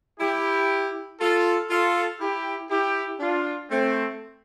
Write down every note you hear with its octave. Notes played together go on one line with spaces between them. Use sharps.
E4 G4
F4 A4
F4 A4
E4 G4
E4 G4
D4 F4
A3 C4